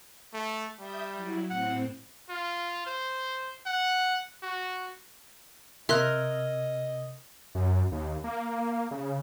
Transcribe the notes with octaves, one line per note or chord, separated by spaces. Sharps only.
A3
G3 E5 D#6 G6
F#3 E4
A2 C4 F#5
F4
C5
F#5
F#4
C3 A#4 D#5 E5 C6 E6 F#6 G#6
F#2
D#2
A#3
C#3